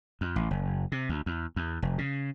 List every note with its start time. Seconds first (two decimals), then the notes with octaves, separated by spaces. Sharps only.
0.21 F2
0.36 A1
0.51 F#1
0.92 C3
1.09 D2
1.26 E2
1.56 E2
1.82 F1
1.98 C#3